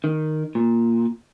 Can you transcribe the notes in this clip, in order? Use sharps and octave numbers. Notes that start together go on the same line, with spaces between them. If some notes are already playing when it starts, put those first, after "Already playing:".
D#3
A#2